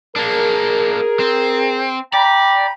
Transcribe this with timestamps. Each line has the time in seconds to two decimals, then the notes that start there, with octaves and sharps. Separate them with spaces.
0.16 A#3 D4 G#4 A#4
1.20 C4
2.14 D5 G5 A#5 B5